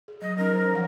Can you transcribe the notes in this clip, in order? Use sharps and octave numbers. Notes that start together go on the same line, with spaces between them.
G#4
F#3 D#5
F#3 C#4 D#4 A#4
C5
F3 F5 F#5